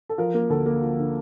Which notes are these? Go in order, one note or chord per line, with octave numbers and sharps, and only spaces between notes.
A4
F3 A#4
A#3
D2 A4
A#3
F3
D3